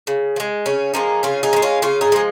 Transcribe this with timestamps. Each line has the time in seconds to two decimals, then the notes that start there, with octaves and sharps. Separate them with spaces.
0.07 C#3
0.36 F3
0.40 G#3
0.66 C#3 C#4
0.94 F3 G#3 A#3 D#4
1.23 C#3 C#4 F4
1.43 D#4 G#4
1.53 F3
1.56 G#3
1.62 C#4 F4
1.82 C#3 C#4 F4
2.01 D#4 G#4
2.12 F3 G#3 G#4